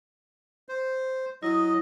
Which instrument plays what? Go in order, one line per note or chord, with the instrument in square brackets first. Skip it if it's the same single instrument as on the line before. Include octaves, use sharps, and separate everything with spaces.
[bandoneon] C5
[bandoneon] F#3 D#5 [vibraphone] E4 D#6